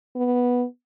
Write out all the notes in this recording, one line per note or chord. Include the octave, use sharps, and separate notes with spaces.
B3